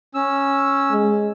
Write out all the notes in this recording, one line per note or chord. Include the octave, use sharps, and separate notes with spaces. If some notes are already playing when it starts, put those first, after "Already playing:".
C#4 E6
G#3